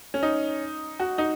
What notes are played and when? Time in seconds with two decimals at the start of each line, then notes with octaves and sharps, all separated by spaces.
0.14 C#4
0.23 D#4
1.00 F#4
1.18 D#4